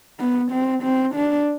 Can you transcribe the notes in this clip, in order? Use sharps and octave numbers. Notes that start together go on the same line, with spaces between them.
B3
C4
C4
D4